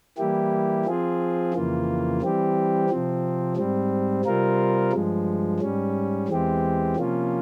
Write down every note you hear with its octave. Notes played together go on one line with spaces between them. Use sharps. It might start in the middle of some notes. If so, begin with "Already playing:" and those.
E3 G3 A#3 E4 G4
F3 C4 F4 G#4
F2 C#3 E3 A#3 F4
E3 G3 C4 G4
C3 F3 C4
G#2 G3 C4
C3 G3 C4 F4 A#4
G2 F3 G#3
G#2 G3 C#4
E2 E3 G#3 C4 G4
C3 F3 A#3 C#4 F4